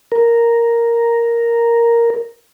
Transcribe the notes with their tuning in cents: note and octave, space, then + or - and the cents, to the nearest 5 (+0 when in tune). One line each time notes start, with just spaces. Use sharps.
A#4 +0